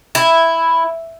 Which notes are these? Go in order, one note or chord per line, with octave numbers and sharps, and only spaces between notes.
E4